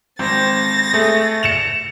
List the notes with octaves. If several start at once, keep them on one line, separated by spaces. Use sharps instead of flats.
G#1 C4 A6 A#6
A3 G#4
C#7 E7 F7